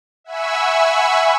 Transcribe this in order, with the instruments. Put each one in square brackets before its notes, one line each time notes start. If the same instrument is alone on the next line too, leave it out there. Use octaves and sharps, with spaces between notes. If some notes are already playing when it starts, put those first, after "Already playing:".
[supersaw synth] E5 F#5 G#5 B5 C#6 E6